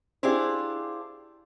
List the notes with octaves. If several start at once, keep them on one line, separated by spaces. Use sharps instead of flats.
D4 E4 F4 G4 G#4 C5